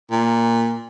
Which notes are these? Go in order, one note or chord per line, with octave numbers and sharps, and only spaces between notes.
A#2